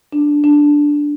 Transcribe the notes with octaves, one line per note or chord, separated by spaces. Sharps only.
D4
D4